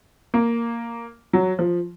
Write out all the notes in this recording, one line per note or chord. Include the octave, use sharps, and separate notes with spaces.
A#3
F#3
F3